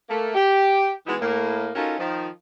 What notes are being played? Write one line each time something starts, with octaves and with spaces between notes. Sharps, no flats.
A3 A#3
G4
E3 G#3 B3 D#4 E4 F#4
A2 A#3
C#4 D#4 F4 F#4 A4 A#4
D#3 F3